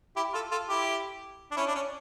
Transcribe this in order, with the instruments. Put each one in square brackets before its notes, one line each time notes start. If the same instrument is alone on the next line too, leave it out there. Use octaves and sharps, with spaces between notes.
[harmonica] E4 G4
F4 A4
F4 A4
E4 G4
D4
C#4 E4
D4
C#4